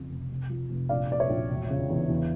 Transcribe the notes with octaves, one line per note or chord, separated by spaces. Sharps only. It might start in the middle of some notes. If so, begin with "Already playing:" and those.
Already playing: F2 C#3
F1
F1
F3
F1
A#1 D5 F5
A#1 D5
C#5 E5
A#1
E1
C#3
E2
E2